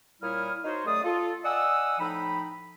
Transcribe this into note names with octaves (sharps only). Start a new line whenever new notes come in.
A#2 G3 E4 C#5 D#6 F6
D#4 F#4 C5 C#5
F#2 A3 G#4 D5 D#6
F4 A4
D5 D#5 F#5 G#5 D#6 E6
A2 F3 D#4 G5 B5